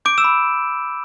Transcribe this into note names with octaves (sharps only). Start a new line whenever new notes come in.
D6 G6 D7
E6 E7
B5